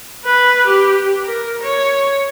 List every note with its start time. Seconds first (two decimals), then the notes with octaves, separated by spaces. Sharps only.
0.25 B4
0.66 G4
1.25 A#4
1.62 C#5